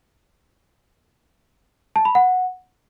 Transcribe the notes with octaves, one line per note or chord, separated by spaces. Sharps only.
A5
B5
F#5